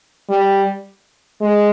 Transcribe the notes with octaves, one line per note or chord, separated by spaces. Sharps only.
G3
G#3